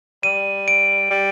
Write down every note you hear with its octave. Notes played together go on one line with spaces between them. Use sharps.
G3 D#7
D7
G3